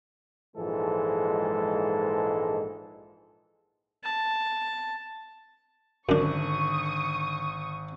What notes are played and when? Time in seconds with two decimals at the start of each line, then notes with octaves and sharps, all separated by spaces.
0.57 A#1 G#2 E3 F3 G#3 A4
4.04 A5
6.09 G#1 F#2 D3 D4 C#6 D#6